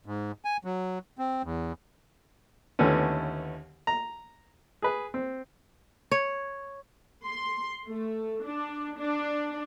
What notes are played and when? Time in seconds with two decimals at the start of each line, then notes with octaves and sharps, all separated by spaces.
0.06 G#2
0.45 G#5
0.65 F#3
1.18 C4
1.44 E2
2.79 D#2 D3 E3 A3 B3 C#4
3.87 A#5
4.82 G#4 B4
5.14 C4
6.11 C#5
7.24 C6
7.87 A3
8.44 D4
8.97 D4